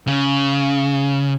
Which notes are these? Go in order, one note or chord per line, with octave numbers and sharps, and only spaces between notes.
C#3